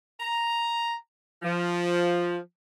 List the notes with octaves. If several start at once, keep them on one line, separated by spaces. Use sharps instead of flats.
A#5
F3